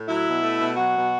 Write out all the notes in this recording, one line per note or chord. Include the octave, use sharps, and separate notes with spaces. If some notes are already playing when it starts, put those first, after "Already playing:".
Already playing: A2
F#3 E4
B2
A3
B2
F#3 F#4
B2